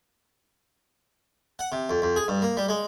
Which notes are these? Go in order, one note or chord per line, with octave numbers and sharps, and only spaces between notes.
F#5
C3
F2
F2
G#4
G2
A#3
G3
G#3